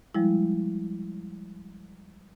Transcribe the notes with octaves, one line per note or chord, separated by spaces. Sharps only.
F3 G3 G#3 E4